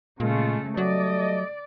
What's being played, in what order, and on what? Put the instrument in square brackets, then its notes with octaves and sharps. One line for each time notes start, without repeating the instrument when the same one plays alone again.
[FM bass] A#2 [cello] C#3 A3 [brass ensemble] G#3 F4
[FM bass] F#3 [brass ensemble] G3 A3 D#5 [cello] D5